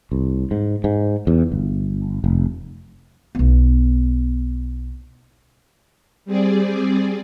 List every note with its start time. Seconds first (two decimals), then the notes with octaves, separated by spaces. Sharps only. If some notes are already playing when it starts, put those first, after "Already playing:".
0.12 C2
0.51 G#2
0.84 G#2
1.27 E2
1.52 G1
2.24 F1
3.35 B1 B3
6.25 G3 C4 G#4 D5